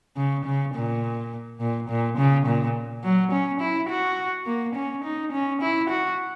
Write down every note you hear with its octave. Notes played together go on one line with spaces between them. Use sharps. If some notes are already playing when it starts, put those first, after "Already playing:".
C#3
C#3
A#2
A#2
A#2
C#3
A#2
F#3
C#4
E4
F#4
A#3
C#4
D#4
C#4
E4
F#4